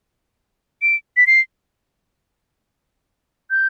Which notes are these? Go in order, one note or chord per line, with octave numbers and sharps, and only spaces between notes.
D7
B6
C7
G6